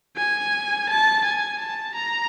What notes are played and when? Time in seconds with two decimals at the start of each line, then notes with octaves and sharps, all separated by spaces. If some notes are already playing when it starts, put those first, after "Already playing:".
0.17 G#5
0.89 A5
1.24 G#5
1.59 A5
1.95 A#5